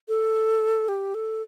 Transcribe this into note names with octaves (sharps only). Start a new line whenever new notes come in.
A4
G4
A4